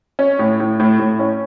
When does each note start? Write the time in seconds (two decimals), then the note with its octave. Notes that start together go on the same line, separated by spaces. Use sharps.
0.19 C#4
0.39 A2
0.60 A2
0.80 A2
0.99 A2
1.19 C#4